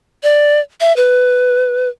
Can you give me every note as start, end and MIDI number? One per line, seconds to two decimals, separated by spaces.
0.23 0.60 74
0.81 0.95 76
0.96 1.89 71